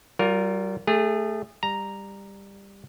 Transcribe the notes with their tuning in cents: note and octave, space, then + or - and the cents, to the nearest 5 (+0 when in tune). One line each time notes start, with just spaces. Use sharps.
G3 -35 F4 +20 A#4 +0
A3 +0 G#4 -30
G3 +15 A#5 +0